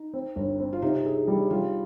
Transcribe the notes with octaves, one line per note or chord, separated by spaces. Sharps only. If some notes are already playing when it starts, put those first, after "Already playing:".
Already playing: D#4
C4
G1
C4
F4
C3 D#4
G#4
G3
G3 F4